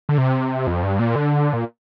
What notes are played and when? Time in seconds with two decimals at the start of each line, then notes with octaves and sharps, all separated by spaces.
0.09 D3
0.18 C3
0.67 F2
0.83 G2
0.99 A#2
1.16 D3
1.53 A#2